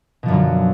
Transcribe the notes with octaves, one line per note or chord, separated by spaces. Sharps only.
F#2 B2 D3 F3 F#3